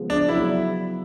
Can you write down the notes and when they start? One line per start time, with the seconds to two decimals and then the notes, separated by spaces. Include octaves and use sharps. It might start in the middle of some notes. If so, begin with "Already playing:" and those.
Already playing: C#3 F3 G#3 B3
0.10 D4
0.28 C#3 F#3 B3 E4